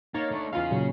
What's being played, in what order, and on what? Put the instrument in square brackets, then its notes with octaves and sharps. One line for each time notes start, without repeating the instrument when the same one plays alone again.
[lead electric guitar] A#3 [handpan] D#4 [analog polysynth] C#5 A6
[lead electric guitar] A3 D4
[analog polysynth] E2 F4 F5 [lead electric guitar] C#4 G#4
[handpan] A#2 C#3 F#3